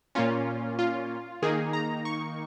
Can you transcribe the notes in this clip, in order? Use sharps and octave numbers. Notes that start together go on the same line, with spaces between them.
A#2 A#3 C#4 F4
F4
D#3 A#3 D#4 G#4
A#5
C#6